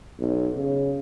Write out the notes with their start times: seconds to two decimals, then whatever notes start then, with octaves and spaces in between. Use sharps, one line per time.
0.19 B1
0.56 C#3